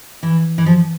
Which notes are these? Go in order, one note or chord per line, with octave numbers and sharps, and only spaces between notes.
E3
E3
F3